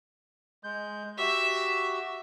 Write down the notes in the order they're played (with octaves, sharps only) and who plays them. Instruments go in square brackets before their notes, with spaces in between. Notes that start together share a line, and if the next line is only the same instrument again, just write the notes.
[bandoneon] G#3 G6
[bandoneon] F#4 G4 [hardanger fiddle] E5